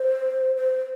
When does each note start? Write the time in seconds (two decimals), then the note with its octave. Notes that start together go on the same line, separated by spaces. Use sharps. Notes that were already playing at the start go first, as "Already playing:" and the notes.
Already playing: C5
0.56 C5